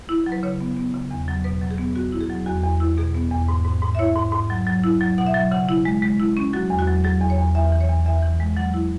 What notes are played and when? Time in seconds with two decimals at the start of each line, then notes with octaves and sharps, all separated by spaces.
0.09 E4
0.26 F#3
0.32 B4
0.43 C#3 C#5
0.60 B3
0.77 B3
0.94 C#3
1.11 E2
1.28 F#3
1.44 B2 B4
1.62 F#3
1.71 G#4
1.78 B3
1.95 B3 F#4
2.12 E4
2.21 G#4
2.30 F#3
2.46 E2 F#4
2.63 E2
2.80 E4
2.97 B2 G#4
3.15 B3
3.31 E2
3.49 G#2
3.65 G#2
3.82 G#2
3.95 E5
3.99 E4 C#5
4.16 G#2
4.32 G#2
4.50 F#3
4.67 F#3
4.84 E4
5.01 F#3
5.18 B2 F#5
5.27 E5
5.34 F#3
5.51 C#3 F#5
5.69 E4
5.85 G#3
6.02 G#3
6.19 E4
6.37 C#4
6.53 F#3 F#4
6.70 E2
6.79 F#4
6.87 F#3
7.04 F#3 G#4
7.21 E2
7.30 C#5
7.38 E2
7.55 E2 E5
7.72 E3
7.81 C#5
7.89 E2
8.06 E2 E5
8.23 E3
8.40 G#3
8.57 F#3 F#5
8.74 E4